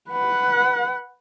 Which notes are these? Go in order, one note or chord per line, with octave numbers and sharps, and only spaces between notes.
B4 F#5